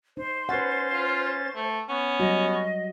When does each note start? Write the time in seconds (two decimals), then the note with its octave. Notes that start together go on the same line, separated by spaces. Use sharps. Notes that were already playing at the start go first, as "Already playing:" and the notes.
0.17 D#4 C5
0.49 C#4 B4 F#5 A6
0.93 F4
1.56 A3
1.89 B3 C#4
2.20 F#3 G3 F#4 D#5